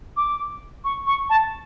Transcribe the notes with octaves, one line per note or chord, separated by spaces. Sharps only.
D6
C#6
C#6
A5